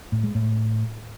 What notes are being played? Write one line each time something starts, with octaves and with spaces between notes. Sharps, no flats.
A2
G#3
A2